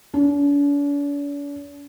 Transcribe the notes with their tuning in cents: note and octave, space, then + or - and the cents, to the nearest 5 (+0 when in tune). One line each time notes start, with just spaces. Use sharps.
D4 -45